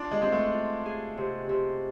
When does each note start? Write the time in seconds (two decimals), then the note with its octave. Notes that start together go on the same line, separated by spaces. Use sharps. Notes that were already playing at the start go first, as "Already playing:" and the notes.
Already playing: D4 F4
0.11 G#3
0.22 G#3 C4
0.32 A3
0.53 F4
0.86 G#4
1.17 C3
1.49 C3